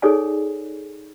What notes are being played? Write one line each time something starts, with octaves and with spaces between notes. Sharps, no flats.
D#4 G#4 A4 C#5 D5 G#5